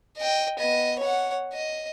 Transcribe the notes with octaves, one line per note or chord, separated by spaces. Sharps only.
D#5 G5
B3 D#5
C#5 F#5
D#5